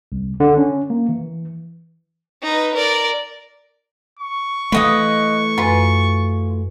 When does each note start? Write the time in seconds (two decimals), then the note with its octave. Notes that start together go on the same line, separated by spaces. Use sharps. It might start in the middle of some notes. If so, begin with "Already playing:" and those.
0.12 C2
0.40 D3
0.57 C#4
0.90 A#3
1.09 E3
2.42 D#4 B4
2.74 A#4 D5
4.19 C#6
4.72 E3 A3 B4 D#5 F5 D#6
5.58 F#2 F4 B4 G#5